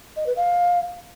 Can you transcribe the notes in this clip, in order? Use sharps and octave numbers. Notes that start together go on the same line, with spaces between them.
D#5
B4
F5